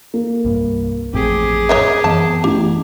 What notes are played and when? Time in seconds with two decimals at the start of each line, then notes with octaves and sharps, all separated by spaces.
0.14 A#3
0.45 C2 G2
1.13 A1 F2 A2 C4 G4 G#4
1.69 C#5 D#5 E5
2.04 F#2 E3 B3 A5
2.44 A1 G4